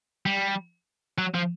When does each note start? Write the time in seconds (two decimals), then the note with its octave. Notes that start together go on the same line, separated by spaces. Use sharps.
0.26 G3
1.18 F#3
1.34 F3